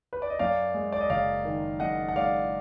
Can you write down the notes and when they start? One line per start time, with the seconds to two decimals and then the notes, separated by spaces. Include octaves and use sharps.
0.13 B4
0.22 D5
0.30 D#5
0.39 F#2 D5 F5
0.74 G#3
0.92 D5
1.01 D#5
1.10 F#1 D5 F5
1.45 D#3
1.80 F#2 D#5 F#5
2.08 F#5
2.16 G#3 D5 F5